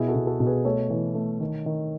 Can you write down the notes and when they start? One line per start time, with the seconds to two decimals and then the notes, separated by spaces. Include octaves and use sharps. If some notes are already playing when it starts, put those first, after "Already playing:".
Already playing: B2 E4 G#4
0.08 F#4 A4
0.15 B2
0.27 F#4 A4
0.40 B2
0.46 G#4 B4
0.65 A3 A4 C#5
0.90 E3
1.15 A3
1.41 D#3
1.66 D#3